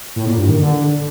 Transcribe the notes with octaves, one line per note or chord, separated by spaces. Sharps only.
A2
A#2
G2
D#3
D3